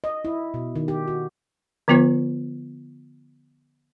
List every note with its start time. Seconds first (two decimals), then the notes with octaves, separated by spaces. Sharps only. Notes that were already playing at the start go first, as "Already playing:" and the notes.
0.04 D#5
0.25 E4
0.54 B2
0.76 D#3
0.88 G4
1.08 F#4
1.88 D3 F3 B3 F4 C5